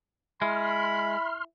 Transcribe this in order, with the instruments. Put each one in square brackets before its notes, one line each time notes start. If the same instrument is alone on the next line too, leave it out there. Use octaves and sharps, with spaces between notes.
[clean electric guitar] G#3 [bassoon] E4 [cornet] B5 [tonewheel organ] C6 F6